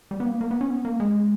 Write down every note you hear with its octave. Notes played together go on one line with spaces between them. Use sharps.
G3
B3
A#3
A#3
B3
C#4
B3
A#3
G#3